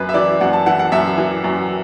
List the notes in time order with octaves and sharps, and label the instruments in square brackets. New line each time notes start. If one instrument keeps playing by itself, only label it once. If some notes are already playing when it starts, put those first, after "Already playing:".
Already playing: [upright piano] F#2 B4
E5
E3 D5
F#2 F#5
A5
E3 F#5
F#5
F#2 E5
E3
F#2